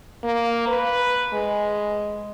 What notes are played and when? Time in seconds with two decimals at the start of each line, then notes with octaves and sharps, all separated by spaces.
0.24 A#3
0.68 B4
1.33 G#3